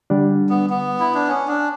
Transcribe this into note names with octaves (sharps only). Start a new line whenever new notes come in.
D3 G3 D4
B3
B3
E4
D4
C#4
D4